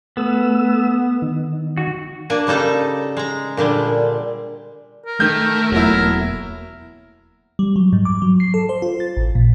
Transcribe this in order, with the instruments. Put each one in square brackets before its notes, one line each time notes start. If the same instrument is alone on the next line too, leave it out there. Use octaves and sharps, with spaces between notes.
[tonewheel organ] A3 E6 [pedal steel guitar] B3
[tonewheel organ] D#3
[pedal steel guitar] F#4
[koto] A#3 D4 G#5
C#3 G3 D#4 A4 A#5
G#3 A#5
A#2 D3 G3 G#3
[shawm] A#4
[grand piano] D#3 G6 [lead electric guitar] A3
[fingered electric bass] E1 A#3 B3 [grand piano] F#3 E4 [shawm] A#4
[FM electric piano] G3
F#3
G#2
D6
F#3
C7
A4
C5
F4
A6
A1
A#2